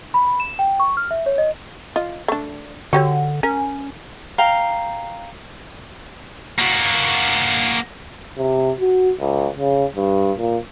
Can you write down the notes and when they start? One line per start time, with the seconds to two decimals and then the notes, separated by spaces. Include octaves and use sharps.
0.14 B5
0.27 B5
0.40 E7
0.59 G5
0.80 C#6
0.97 F6
1.11 E5
1.26 C#5
1.38 D#5
1.96 F4 D#5
2.28 A3 D4
2.93 D3 F#4 G4 C#5
3.43 C#4 A#4
4.38 F5 G5 A#5
6.59 A#3 F#4
8.38 C3
8.80 F#4
9.20 C#2
9.58 C#3
9.96 G2
10.38 A#2